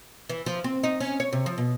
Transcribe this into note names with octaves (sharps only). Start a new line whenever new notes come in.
E3
F3
C4
D#4
C#4
C#5
C3
F3
B2